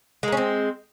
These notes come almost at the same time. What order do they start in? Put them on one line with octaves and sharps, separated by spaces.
G#3 A#3 C#4 C4